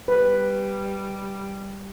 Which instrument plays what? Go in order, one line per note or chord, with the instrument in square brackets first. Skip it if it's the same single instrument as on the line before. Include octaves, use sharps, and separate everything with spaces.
[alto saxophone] G3 [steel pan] B4